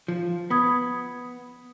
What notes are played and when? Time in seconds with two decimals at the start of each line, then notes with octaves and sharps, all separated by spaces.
0.08 F3
0.50 B3 B5 D#6 G#6